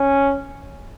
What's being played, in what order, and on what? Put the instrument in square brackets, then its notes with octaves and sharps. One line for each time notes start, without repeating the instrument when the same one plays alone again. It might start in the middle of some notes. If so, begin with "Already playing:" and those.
Already playing: [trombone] C#4